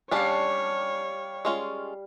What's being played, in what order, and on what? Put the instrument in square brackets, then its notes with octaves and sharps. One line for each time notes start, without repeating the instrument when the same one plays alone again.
[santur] G3 F5 [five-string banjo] C#4 D4 A5 [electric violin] C#5
[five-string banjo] G#3 C#4 F4